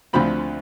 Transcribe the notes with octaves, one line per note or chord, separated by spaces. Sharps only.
D2 D3 F3 C4 B5